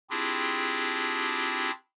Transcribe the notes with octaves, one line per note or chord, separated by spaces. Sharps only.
C4 D4 E4 F4 G4 G#4